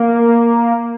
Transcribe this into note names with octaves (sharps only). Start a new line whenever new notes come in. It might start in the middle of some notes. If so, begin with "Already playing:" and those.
Already playing: A#3